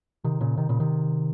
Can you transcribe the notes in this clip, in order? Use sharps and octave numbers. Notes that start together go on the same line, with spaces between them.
C3 D#3
A#2 C#3
C3 D#3
A#2 C#3
C3 D#3